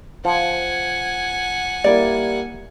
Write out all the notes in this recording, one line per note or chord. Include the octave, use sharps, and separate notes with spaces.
F3 F#5 G#5
G3 A#3 E4 D5